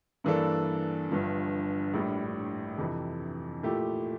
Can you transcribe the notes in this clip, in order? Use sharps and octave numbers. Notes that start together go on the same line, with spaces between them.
G2 E3 A#3 D4 A4
G1 G2 F3
A#1 A2 G3
F2 C3 E3
A#2 F3 A3 E4 G4